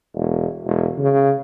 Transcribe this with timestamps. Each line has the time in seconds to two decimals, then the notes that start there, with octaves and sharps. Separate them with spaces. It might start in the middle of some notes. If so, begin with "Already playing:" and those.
0.14 E1
0.65 E1
0.98 C#3